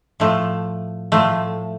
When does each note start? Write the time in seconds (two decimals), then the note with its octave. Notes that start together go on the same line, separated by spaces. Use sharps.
0.20 A2 F3 A3
1.12 A2 F3 A3